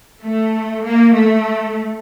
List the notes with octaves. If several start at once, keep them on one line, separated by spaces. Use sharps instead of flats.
A3
A#3
A3